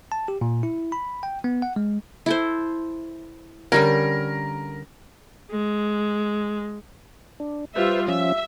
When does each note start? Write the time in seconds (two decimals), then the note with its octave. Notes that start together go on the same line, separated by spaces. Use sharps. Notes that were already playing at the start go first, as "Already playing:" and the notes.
0.12 A5
0.28 G4
0.41 A#2
0.63 E4
0.92 B5
1.23 G5
1.44 B3
1.62 F#5
1.76 G#3
2.26 E4 A4 C5
3.72 D3 G3 C#4 A#4
5.51 G#3
7.40 D4
7.76 G3 F4 B4 C5 E5
8.08 F3 C#4 F4 E5